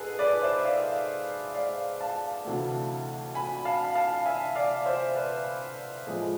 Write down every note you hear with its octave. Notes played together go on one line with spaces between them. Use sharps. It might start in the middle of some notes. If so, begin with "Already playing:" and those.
Already playing: G#2 G#4 A4 B4
B4 D5
C5 E5
D5 F5
D5 F5
F5 A5
D2 C3 E3 A3
G#5 B5
F5 A5
F5 A5
E5 G#5
D5 F5
C5 E5
B4 D5
A2 F3 G#3 G#4